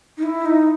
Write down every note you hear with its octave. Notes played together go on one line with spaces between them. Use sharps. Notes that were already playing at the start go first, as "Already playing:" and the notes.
D#4
E4
D#4